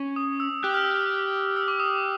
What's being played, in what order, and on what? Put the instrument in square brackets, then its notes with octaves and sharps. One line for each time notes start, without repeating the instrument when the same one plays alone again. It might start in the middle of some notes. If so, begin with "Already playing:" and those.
Already playing: [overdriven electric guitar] C#4
[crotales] D#6
E6
[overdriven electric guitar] G4 [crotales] F#6
[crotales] F6
E6
F6
E6
D6
D#6